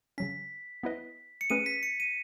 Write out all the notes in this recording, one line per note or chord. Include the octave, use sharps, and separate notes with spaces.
C#3 F#3 C#4 B6
B3 E4 B4 D#5
C#7
A3 C#4 G#4 B4 D#7
B6
C#7
D#7